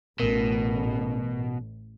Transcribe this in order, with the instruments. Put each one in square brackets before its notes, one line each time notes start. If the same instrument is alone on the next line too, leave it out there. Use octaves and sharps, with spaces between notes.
[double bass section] A1 [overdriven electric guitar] B2 [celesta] A#4